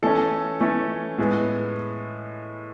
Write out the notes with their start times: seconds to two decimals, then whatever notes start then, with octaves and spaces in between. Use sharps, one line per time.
0.02 E3 A3 C#4 A4
0.60 E3 A3 C#4
1.18 A2 G#3 B3